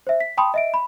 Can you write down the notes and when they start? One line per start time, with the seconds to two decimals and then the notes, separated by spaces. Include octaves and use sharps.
0.07 C5 E5
0.20 B6
0.37 G5 A5 B5 C6 D#6
0.54 D#5 E5 D7
0.74 B5